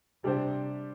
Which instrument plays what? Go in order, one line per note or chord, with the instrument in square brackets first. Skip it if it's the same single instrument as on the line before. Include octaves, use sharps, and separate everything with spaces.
[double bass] C3 [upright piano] G3 D4 G4 C5